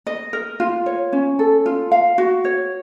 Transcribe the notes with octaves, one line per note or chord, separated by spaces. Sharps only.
D#5
A#4
F4
C#5
C#4
A4
F4
F5
F#4
C#5